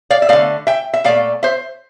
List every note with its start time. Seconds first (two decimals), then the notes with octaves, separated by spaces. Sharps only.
0.10 D5 F5
0.22 E5
0.29 D3 A3 D5 F5
0.67 E5 G5
0.94 E5
1.04 A#2 A3 D5 F5
1.43 C5 E5